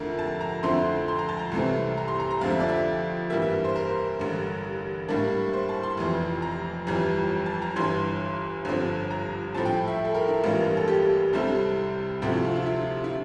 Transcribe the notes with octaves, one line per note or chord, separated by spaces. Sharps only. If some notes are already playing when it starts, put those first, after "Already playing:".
Already playing: F2 D3 A3 E4 A#4
A5
A#5
F2 D3 A3 C4 E4 C6
C6
A#5
A5
A#5
C2 C3 E3 A3 C4
A#5
C6
A#5
A#5
F2 D3 F3 A3 C4 F5
E5
D5
E5
G2 E3 G3 A#3 E5
E5
C5
A#4
A1 G2 D3
A2 G3 A#3 D4
C5
A5
C6
F1 F2 E3
A#5
G1 F2 E3 G3 A#5
A5
A#5
G1 G2 E3 C6
G1 G2 D3 F3 C4
A#5
A2 F3 A3 C4 A5
G5
E5
A4
A#4
E4
A1 G2 E3 G3 A#3 F4
A4
G4
C2 C3 G3 C4 E4 A4
D2 C3 F3 A3 C4 G4
E4
F4
F4
E4
E4